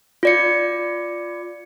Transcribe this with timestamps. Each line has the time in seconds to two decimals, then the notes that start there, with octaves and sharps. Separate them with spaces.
0.23 F4 D5 C#7